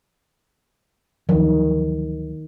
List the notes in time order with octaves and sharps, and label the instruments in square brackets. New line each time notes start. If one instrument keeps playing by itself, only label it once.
[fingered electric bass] D2 F3 F#3 [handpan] D#3